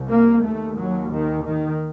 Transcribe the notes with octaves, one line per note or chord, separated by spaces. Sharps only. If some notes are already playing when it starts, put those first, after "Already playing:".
Already playing: C2 C3
A#3
D#2 A3
F#3
D#3
D#3